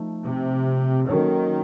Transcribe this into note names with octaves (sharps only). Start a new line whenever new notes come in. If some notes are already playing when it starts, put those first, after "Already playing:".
Already playing: F3 A3 D#4
C3
D#3 F#3 A#3 C#4 A4 C#5